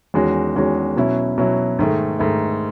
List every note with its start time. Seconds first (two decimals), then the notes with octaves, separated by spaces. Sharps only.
0.14 E2 D#3 G#3 C#4 F#4
0.56 E2 D#3 G#3 C#4 F#4
0.96 B2 F#3 C#4 E4
1.38 B2 F#3 C#4 E4
1.79 G#2 D#3 A3
2.19 G#2 D#3 A3